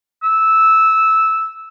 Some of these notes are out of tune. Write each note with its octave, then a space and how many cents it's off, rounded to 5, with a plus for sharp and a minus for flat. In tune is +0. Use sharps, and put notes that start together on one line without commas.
E6 -10